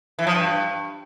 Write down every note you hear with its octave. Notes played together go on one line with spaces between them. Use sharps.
E3
F3
G2